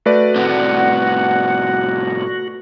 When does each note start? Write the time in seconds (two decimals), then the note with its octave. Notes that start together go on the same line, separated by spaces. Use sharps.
0.06 A3 F#4 B4 D5
0.35 A2 C3 F#5